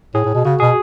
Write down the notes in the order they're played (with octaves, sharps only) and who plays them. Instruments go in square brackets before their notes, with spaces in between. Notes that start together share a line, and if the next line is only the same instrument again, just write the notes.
[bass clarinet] A2 [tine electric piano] G#4
[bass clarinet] A2
B2
[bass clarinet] C#3 [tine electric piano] F#4
[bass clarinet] B2 [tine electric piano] G#4